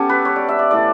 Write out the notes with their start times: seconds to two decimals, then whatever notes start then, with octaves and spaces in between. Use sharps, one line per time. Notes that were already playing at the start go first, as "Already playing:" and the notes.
Already playing: B3 C#4 G4 A4
0.09 B4
0.25 C#5
0.36 D5
0.48 E5
0.59 D5
0.71 A2 E3 A3 D5